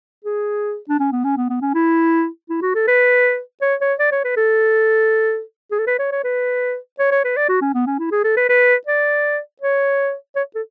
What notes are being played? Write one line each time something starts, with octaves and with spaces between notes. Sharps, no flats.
G#4
D4
C#4
B3
C#4
B3
B3
C#4
E4
E4
F#4
A4
B4
C#5
C#5
D5
C#5
B4
A4
G#4
A4
B4
C#5
C#5
B4
C#5
C#5
B4
D5
F#4
C#4
B3
C#4
E4
G#4
A4
B4
B4
D5
C#5
C#5
A4